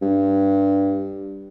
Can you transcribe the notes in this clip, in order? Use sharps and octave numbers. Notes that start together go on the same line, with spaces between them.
G2